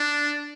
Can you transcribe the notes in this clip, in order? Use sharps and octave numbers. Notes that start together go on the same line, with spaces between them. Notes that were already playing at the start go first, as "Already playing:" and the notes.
Already playing: D4